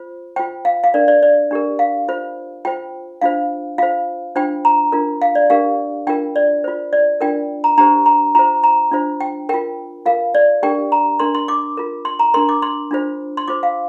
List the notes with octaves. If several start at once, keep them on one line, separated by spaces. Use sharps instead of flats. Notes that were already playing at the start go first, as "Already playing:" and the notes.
Already playing: F4 C5
F4 C5 G5
F5
F5
D4 A#4 D5
D5
D5
D4 G4 A#4
F5
F4 C5
F4 C5 G5
D4 F4 C5 F5
F4 C5 F5
D4 F4 C5 G5
A#5
D4 F4 A#4
F5
D5
D4 G4 A#4 F5
D4 F4 A#4 G5
D5
F4 C5
D5
D4 F4 A#4 G5
A#5
D4 G4 C5 A#5
A#5
F4 C5 A#5
A#5
D4 F4 C5
G5
F4 A#4 G5
F4 A#4 F5
D5
D4 G4 A#4 G5
A#5
D4 A#4 C6
C6
D6
F4 A#4
C6
A#5
D4 A#4 C6
D6
C6
D4 F4 C5
C6
F4 C5 D6
F5